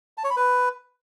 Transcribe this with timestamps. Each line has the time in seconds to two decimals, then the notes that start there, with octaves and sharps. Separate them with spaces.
0.18 A5
0.24 C#5
0.30 B5
0.37 B4